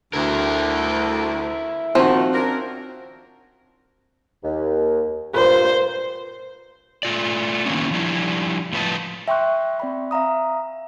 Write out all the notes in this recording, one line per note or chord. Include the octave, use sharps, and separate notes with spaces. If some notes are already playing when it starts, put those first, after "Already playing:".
D2 E4 A#4
A#2 D#3 F3 C4 F#4
C#4 D4 A#4
D#2
G2 A#2 C5
A3 F4 D5
D#3 E3 F#3 A#3 B3 C#4
F3 G3 D4 E4
A2 F3 B4 C#5 D#5 A5
E5 G5 C6 C#6 F#6
C4 D5 G5 B5
E5 F5 A#5 D#6